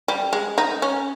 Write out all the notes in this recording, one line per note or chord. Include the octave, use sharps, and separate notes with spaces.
G3
G#3
D#4
C#4